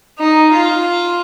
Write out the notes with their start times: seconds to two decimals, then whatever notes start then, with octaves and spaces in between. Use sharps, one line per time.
0.19 D#4
0.53 F4